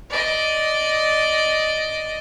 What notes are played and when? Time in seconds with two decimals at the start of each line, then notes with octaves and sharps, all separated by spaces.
0.10 D5 D#5